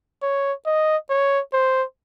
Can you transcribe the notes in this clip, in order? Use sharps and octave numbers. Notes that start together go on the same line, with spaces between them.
C#5
D#5
C#5
C5